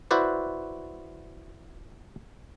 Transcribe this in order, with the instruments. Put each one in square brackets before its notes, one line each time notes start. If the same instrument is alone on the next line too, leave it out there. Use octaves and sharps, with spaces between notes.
[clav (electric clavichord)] E4 F#4 B4 C5 D5